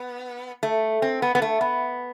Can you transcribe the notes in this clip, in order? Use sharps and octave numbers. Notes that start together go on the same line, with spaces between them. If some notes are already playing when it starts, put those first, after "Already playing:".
Already playing: B3
A3
C4
B3
B3
A3
B3